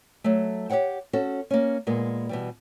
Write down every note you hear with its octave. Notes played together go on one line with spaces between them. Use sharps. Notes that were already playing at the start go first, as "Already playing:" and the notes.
F#3 A3
G4 A4 C#5 F#5 G5
C#4 F#4 A4
A#3 C#4
A#2 G#3 A#3 B3
B2 E3 G3